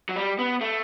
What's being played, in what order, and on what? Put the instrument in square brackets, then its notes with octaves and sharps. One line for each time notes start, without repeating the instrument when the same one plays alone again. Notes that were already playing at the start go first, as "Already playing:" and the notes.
[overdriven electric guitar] F#3
G3
B3
A3